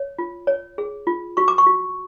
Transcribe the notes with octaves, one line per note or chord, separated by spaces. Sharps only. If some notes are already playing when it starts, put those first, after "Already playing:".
Already playing: C#5
F4
C#5
G#4
F4
F#4 C#6
D6
C#6
F#4